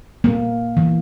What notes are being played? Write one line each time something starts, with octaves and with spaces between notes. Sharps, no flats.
A#3
E3